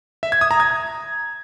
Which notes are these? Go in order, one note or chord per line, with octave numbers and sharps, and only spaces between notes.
E5
G#6
D#6
A#5
G#6